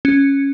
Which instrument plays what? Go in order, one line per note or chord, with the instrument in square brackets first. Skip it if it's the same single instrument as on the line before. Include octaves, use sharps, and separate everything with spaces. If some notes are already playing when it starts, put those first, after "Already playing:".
[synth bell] C#4